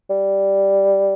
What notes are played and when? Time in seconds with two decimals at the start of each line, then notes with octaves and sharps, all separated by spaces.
0.10 G3